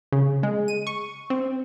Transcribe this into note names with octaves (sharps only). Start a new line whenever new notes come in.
C#3
G#3
D#7
C#6
C4